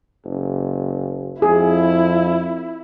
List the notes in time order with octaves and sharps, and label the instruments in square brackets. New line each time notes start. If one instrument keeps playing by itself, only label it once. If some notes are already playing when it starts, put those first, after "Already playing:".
[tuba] F#1
[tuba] F2 [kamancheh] E4 [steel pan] G#4